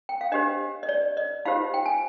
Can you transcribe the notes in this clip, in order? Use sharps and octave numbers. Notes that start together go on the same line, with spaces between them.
G5
F5
D4 G4 C5 D#5
D#5
D5
D#5
D#4 F4 G4 C5 F5
G5
G#5